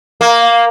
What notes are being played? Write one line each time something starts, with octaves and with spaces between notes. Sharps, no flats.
A#3